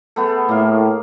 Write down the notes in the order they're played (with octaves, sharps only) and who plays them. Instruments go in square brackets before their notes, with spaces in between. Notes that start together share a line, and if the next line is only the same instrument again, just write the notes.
[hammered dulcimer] A3 B3 G#4
[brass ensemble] A2 [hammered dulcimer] A#3 F5